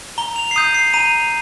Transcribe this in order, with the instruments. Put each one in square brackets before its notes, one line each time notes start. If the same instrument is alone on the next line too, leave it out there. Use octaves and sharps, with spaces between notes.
[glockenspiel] A#5 G7
F7
C7
D#6 G6 D#7
C7
A#5 D#7